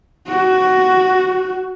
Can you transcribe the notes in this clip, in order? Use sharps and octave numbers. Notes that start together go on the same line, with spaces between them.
F#4